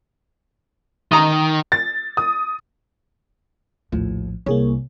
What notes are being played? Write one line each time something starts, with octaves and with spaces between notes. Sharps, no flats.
D#3 A#5 D#6
A6
D#6
A#1 D#2 A2 F3
C2 A#3 G#4 C#5